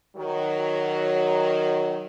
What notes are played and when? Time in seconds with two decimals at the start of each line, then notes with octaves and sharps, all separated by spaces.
0.16 D#3 F#3